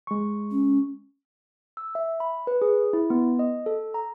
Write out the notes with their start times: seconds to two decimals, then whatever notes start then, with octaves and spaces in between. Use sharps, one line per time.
0.07 G#3 C#6
0.52 C#4
1.77 E6
1.95 E5
2.20 B5
2.47 B4
2.62 G#4
2.93 E4
3.10 B3
3.39 D#5
3.66 A4
3.94 A#5